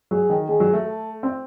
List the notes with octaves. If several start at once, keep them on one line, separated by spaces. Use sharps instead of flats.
F#3 G#4
D#3
D#3 G#4
F#3
A3
A4
C4